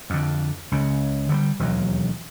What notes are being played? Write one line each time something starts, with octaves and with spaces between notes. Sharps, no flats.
F2 D3
C#2 C#3
D3 E3 G3
E1 D#2 F#3